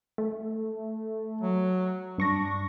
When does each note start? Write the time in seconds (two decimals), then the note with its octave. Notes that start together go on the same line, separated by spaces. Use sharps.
0.18 A3
1.41 F#3
2.18 G2 D4 C#6 A#6